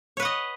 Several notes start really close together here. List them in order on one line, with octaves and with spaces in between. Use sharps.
C#5 B4 F#5 D#5